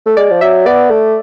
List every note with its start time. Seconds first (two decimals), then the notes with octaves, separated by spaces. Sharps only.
0.06 A3
0.17 G#3 D5
0.31 F3
0.41 F#3 E5
0.66 B3 D5
0.90 A3